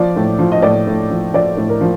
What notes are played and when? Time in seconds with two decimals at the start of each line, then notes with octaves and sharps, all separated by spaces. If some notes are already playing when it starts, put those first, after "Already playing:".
Already playing: F3 D5
0.16 A2
0.39 F3
0.52 D#5
0.62 A2 D5
0.87 A2
1.10 F3
1.33 F3 D5
1.57 A2
1.69 A#4
1.81 F3